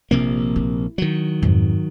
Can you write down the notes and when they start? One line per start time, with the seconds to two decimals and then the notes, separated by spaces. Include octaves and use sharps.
0.11 A#1 C3 A#3
0.56 E4
0.98 D#3 F#3
1.42 F2 G#2